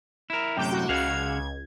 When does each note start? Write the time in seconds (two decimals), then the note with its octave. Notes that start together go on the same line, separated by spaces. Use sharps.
0.30 E4 A#4
0.57 F#2 A2 C3 G5 D6 G6
0.72 F#4
0.89 C#2 C#3 F5 F#5 G#6